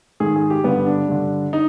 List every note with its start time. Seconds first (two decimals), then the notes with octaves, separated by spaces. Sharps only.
0.20 G#2 D#3 G#4
0.36 G#4
0.50 G4
0.64 G2 D3 B3
0.87 D4
1.09 G2 D3
1.53 D#4